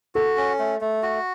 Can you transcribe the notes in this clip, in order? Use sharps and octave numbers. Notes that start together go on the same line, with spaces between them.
F#4 A4
C#4
A3
A3
F#4